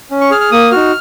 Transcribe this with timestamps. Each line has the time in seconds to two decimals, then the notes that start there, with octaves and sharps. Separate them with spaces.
0.11 C#4
0.21 C#6
0.31 G#4 F6
0.41 F6
0.52 A#3 D#6
0.72 D#4 F#4 F6